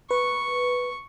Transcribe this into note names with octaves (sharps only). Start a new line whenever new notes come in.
B4 C#6